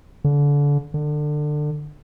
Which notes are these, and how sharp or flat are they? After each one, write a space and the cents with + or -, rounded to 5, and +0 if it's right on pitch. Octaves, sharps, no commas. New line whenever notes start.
D3 -30
D3 +25